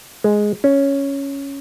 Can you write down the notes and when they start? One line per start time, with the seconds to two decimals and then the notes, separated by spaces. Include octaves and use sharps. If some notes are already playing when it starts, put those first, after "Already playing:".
0.24 G#3
0.64 C#4